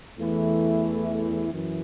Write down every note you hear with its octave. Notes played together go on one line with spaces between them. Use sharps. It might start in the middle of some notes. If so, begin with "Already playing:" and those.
E2 E3 A3 E4
F#2 E3